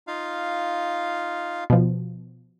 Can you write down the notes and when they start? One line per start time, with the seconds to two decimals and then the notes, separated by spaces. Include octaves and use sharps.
0.07 D#4 F4 F5
1.70 B2 F3